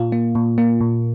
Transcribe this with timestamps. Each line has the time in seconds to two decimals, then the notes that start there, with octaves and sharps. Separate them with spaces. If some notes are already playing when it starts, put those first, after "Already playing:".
Already playing: A#2 F4
0.12 A#3
0.35 A#2
0.58 A#3
0.81 A#2